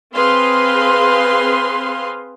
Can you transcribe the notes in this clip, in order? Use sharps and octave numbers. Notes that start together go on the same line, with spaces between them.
C4 G#4 B4 F5 C6